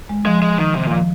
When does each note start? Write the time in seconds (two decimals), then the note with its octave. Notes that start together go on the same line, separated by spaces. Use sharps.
0.09 G#3
0.25 F3 G#3
0.42 G#3
0.58 D#3
0.74 C3 D#3
0.86 A#2 F3